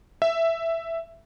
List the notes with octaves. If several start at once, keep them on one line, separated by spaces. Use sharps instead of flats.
E5